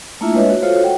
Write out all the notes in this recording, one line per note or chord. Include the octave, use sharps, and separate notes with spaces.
A3 A#3 D4 E4 F4 E5
G#3 D4 B4 C#5 D#5 E5
F#4
F4 F#4 A4 C5 C#5 F5
F#4 F#5 G5